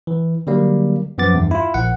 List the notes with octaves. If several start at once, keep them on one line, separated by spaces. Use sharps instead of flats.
E3
D3 F#3 G3 A#3
F#2 F3 B3 D6 A6
E2 G2
E4 F4
A#1 F#5